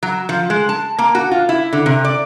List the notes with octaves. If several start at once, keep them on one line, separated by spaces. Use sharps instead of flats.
F#3
F3
G#3
A5
A#3
F#4
F4
E4
D3
C3
D5